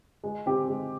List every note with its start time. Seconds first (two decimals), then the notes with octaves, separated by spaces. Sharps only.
0.24 G#3
0.46 C4 G4
0.68 G#3